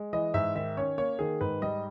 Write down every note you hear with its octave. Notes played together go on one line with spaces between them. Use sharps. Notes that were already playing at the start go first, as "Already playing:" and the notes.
Already playing: G#3
E3 D#5
G#2 E5
D#3 E5
C#4 C#5
A#3 C#5
D#3 G#4
G#2 B4
G3 D#5